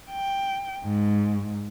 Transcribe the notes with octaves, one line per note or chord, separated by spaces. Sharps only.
G5
G#2